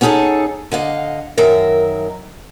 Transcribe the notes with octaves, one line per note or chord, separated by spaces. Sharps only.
B3 C#4 D#4 G#4 A4 C#5
D3 D#5 F5
F#2 D#3 A#4 E5